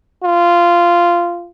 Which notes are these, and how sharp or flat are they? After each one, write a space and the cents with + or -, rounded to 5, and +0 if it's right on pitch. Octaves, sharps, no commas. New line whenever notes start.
F4 -10